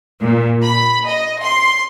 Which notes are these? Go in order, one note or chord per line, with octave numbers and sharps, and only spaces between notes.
A#2
B5
D#5
C6